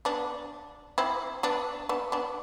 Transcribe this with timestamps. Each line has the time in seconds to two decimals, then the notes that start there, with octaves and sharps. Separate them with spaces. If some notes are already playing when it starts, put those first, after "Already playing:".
0.05 B3 D4
0.98 C4 E4
1.43 B3 D4
1.89 B3 D4
2.12 B3 D4